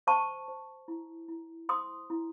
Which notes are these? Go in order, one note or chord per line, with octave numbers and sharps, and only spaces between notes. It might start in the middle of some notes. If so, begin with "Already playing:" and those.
C5 A5 C#6
C5
E4
E4
C5 C6 D#6
E4